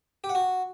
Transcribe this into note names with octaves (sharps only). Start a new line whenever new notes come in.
G4
F#5
F#4